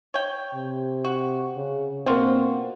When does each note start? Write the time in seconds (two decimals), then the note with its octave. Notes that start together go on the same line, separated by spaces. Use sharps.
0.14 C#5 G5
0.54 C3
1.04 F#4
1.56 C#3
2.06 B2 A#3 C4 D4 F4 F#4